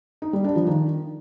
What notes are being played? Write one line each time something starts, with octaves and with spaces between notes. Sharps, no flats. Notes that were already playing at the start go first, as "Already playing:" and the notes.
D#4
G3
D4
F3
D#3